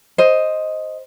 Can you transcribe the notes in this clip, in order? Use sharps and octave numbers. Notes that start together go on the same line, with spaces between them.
C5 D#5